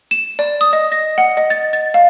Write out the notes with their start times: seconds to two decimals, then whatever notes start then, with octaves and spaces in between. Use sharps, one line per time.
0.11 E7
0.39 D5
0.61 D#6
0.73 D#5
0.92 A#6
1.18 F#5
1.37 D#5
1.50 A6
1.73 A6
1.94 F5